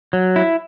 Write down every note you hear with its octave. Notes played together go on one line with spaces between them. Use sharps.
F#3
E4